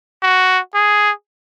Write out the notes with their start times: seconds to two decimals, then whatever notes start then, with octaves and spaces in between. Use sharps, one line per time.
0.23 F#4
0.74 G#4